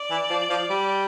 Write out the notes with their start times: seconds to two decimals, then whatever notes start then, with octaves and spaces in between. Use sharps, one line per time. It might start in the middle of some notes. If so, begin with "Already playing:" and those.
Already playing: D5
0.11 E3
0.30 F3
0.50 F3
0.70 G3